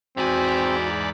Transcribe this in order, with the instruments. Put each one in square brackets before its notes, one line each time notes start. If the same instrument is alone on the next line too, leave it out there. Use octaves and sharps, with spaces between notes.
[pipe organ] E2 D5 B5 [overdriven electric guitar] G#2 G#5 [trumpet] C4 [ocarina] F#4